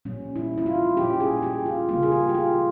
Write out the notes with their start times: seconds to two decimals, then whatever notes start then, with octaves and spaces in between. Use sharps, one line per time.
0.05 A#2 G3 C#4
0.36 E4
0.58 E4
0.66 F4
0.97 A#2 G3 C#4 G4
1.20 G#4
1.43 G4
1.66 F4
1.89 C#3 G3 A#3 F4
2.03 G#4
2.12 G4
2.29 G4
2.35 F4